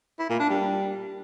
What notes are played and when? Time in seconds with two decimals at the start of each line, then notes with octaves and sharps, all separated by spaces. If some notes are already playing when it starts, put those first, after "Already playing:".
0.19 E4
0.29 A#2
0.40 D4
0.50 G3